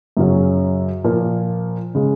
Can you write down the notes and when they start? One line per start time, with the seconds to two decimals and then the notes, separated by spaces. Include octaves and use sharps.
0.17 F#2 C#3 F#3 C#4
1.04 A#2 F3 A#3
1.95 C#3 G#3